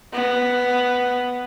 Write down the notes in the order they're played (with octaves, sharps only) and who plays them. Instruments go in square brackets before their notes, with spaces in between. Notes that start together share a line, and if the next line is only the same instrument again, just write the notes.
[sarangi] B3